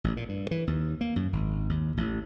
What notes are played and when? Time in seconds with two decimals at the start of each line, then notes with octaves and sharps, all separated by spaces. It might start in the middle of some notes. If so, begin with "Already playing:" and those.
0.04 A1
0.17 A#2
0.29 G2
0.51 E3
0.67 D#2
1.01 A#3
1.16 F#2
1.33 G#1
1.70 D#2
1.97 A1